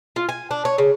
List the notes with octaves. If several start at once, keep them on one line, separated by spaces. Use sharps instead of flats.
F4
G#5
D4
C#5
C#3